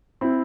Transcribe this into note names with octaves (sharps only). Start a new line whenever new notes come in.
C4 E4